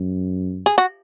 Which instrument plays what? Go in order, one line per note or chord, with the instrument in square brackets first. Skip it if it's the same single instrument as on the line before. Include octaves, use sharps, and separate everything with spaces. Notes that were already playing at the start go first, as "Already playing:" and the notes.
Already playing: [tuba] F#2
[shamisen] G#4
F#4